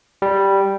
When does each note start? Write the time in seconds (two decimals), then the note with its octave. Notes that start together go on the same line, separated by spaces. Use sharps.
0.22 G3